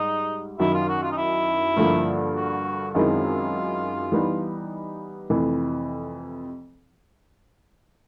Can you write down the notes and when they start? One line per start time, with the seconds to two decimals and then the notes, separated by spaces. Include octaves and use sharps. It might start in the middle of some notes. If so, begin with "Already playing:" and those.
Already playing: G#2 G3 D#4
0.60 F#2 D#3 F#3 E4
0.74 F4
0.89 F#4
1.03 F4
1.12 D#4
1.17 E4
1.76 G2 D3 F3 A#3
2.35 F#4
2.95 F#2 D#3 G#3 C4 E4 F4
4.12 E3 G3 B3 D#4
5.30 F2 C3 E3 A3